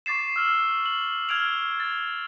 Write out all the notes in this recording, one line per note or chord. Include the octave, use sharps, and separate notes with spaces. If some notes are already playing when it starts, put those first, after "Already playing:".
C#6 D6 A6 C7 E7
E6 F6
F#7
F6 G#6 D7 F7
A6